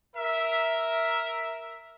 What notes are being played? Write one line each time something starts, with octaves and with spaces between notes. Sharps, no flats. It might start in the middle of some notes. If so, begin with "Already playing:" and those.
A#4 E5